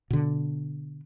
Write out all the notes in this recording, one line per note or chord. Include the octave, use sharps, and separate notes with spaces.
B2 D3